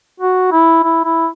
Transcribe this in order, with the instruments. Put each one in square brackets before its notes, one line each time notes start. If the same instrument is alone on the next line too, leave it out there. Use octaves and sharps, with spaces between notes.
[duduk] F#4
E4
E4
E4